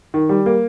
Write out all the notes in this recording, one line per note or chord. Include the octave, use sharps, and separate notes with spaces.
D#3
G3
A#3